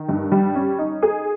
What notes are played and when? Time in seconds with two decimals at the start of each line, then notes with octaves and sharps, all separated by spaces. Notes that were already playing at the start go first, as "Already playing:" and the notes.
Already playing: D#3
0.09 G2
0.32 G3
0.55 C#4
0.78 D#4
1.02 G#4